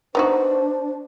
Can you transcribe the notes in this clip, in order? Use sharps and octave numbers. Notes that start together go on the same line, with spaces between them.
B3 D4 D#4 F#4 C5